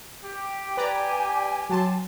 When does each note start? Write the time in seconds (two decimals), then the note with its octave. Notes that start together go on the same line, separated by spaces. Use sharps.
0.24 G4
0.77 B4 D5 G#5 A#5
1.69 F#3 A5 C6